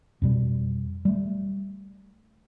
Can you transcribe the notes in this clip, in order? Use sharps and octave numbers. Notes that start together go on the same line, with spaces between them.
F2 B2 G3
G3 A3